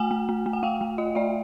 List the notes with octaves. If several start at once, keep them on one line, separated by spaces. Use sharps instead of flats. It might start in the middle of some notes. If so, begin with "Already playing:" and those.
Already playing: A3 F#5 G#5
A3
A3
A3
F#5
A3 F5 G5
A3
F4 D#5
A3 D5 E5